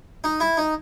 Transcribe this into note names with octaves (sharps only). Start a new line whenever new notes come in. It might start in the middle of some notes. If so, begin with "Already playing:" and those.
D#4
E4
D#4